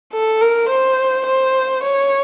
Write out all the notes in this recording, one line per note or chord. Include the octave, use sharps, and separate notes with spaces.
A4
A#4
C5
C5
C#5